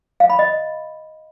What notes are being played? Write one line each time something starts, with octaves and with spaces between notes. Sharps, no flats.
F5
B5
D#5